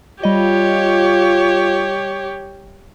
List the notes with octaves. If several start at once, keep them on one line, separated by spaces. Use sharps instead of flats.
G3 F4 G4 C#5 D#5